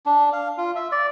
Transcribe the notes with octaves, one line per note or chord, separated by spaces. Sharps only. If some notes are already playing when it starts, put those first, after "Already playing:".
D4
F5
F4
E5
D5